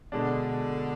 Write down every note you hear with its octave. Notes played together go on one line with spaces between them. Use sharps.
B2 D3 G#3 D4